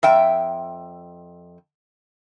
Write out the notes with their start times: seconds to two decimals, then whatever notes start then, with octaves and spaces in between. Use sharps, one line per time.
0.03 F2 E5 G5